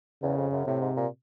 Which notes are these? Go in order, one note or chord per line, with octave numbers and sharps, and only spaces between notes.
E2 C#3
F2
F#2
A2 C3
G#2
A#2